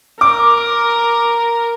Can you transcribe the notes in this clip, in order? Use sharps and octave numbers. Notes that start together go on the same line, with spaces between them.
A#4 D6